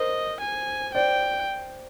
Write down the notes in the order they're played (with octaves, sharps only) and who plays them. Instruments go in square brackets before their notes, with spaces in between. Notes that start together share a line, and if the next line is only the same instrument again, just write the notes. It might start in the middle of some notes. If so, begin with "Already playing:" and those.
Already playing: [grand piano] A#4 C5 [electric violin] D#5
[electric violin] G#5
[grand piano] C5 D5 [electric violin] G5